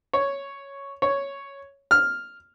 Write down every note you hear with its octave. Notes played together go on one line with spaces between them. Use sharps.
C#5
C#5
F6